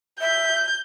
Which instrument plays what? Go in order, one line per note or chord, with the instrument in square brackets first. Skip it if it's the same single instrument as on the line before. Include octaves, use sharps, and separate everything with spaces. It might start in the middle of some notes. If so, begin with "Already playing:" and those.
[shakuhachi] E5 [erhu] G6